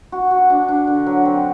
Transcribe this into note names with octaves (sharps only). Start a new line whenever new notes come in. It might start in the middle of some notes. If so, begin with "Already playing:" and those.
F#4
F#4
D4
D4
D3
F#3
C4